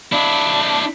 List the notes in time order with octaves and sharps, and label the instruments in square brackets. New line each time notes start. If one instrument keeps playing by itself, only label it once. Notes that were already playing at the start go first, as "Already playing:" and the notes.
[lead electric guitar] D4 E4